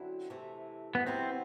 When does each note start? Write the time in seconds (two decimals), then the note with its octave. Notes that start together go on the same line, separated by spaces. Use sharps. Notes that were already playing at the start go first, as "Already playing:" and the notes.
Already playing: F#2 D3 F#3 C4 E4
0.30 C3 E3 A3
0.95 B3
1.07 C3 F#3 B3 C4 E4